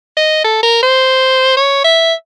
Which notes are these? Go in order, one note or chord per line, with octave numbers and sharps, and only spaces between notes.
D#5
A4
A#4
C5
C#5
E5